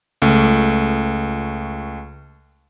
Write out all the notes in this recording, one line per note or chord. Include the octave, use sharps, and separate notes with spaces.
C#2 A3